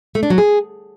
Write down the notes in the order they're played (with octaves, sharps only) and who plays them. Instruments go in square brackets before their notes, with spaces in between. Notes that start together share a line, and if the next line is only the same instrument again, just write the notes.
[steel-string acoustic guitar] A3
D4
F#3
G#4